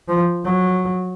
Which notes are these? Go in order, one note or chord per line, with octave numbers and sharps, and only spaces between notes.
F3
F#3